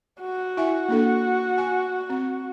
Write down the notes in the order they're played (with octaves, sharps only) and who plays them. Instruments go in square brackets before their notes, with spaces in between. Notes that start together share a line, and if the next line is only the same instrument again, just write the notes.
[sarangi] F#4
[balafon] E4 E5 G#5
A#3 D4 A4
G#5
C4